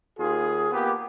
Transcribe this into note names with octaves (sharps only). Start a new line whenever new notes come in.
D#2 F4 G#4
A#3 B3 G4